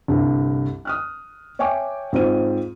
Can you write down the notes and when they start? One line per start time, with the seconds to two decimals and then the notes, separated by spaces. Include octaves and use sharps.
0.08 C2 G2 D3
0.85 D#6 F6 F#6
1.59 C#5 E5 G5 G#5 C#6 D6
2.13 G#2 C4 F4 C5 D#7